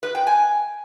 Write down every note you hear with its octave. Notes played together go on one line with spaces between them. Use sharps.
B4
G5
G#5